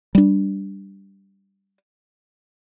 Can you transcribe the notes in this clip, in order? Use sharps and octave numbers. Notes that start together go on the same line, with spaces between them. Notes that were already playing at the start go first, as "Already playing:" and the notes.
G3 D4